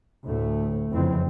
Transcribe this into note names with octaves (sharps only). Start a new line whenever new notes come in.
D2 A2 A3
F#1 F2 C#3 E3 C4